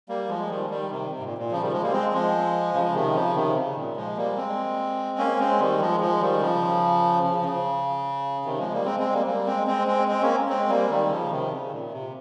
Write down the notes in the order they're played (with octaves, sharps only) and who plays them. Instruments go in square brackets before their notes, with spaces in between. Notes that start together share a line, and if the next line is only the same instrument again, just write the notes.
[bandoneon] G3 A#3
F3 G#3
D#3 G3
D#3 G3
C3 D#3
C3
G#2
A#2
A#2
C#3 F3
D#3 G3
F3 G#3
G3 A#3
G#3 C4
F3 G#3
C#3 F3
C#3
C3 D#3
C#3 F3
C3 D#3
C#3
A#2
F3 G#3
G3 A#3
G#3 C4
A#3 C#4
G#3 C4
D#3 G3
F3 G#3
F3 G#3
D#3 G3
C#3 F3
C#3 F3
C#3
C3 D#3
F3 G#3
G3 A#3
G#3 C4
G#3 C4
G3 A#3
G3 A#3
G#3 C4
G#3 C4
G#3 C4
G#3 C4
A#3 C#4
G#3 C4
G3 A#3
D#3 G3
C#3 F3
C3 D#3
C#3
A#2
C3